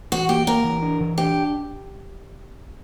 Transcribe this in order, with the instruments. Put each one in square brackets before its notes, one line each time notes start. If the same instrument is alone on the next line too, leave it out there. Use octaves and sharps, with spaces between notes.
[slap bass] E3 [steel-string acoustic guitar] F#4
[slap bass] A#3 [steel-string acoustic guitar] G4
[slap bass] A#3 [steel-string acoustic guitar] A#4
[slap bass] E3
D4
E3
[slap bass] D4 [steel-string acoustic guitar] G4